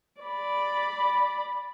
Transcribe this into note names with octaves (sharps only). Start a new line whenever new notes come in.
D5 B5